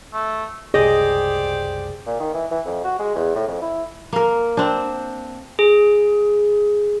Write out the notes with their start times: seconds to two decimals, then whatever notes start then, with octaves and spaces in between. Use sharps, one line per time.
0.13 A3
0.74 F#1 C2 G4 G#4 C5 D5 D#5
2.06 A#2
2.20 D#3
2.34 E3
2.51 E3
2.66 F2
2.84 F#4
3.00 G#3
3.15 E2
3.36 A2
3.48 F2
3.62 E4
4.13 A#3 A#4
4.57 C4 D4
5.59 G#4